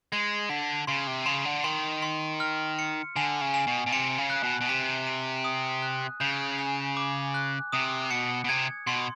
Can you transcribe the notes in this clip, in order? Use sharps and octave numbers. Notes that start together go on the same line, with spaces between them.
G#3 G#6
D3 B6
C#3 C6
C3
C#3 C6
D3
D#3 C6
C6
F6
C#7
D3 G#5
C#3
G#5
B2
B2
C3 C#7
C#3
F#6
B2
B2
C3 B6
D#7
D#6
F#6
C#3 G6
G#5
D6
F#6
C3 D#6
B2 C#7
B2
C3 G#6
B2 C6